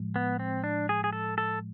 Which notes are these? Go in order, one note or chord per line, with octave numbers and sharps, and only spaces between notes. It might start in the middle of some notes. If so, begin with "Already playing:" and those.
Already playing: A2 F3 G#3
B3
C4
D4
G#4
G#4
A4
A4